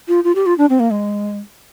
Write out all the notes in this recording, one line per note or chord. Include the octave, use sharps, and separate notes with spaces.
F4
F4
G4
F4
D4
C4
A#3
G#3